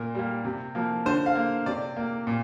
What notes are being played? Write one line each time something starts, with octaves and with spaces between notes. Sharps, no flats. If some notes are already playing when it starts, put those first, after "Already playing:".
Already playing: A#2 A#4
G3 A#3
C3
F3 A#3
D3 C5
F5
A#3
C3 D5
A#3
A#2